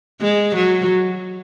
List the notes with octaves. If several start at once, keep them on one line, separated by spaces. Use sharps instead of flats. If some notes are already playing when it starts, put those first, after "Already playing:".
G#3
F#3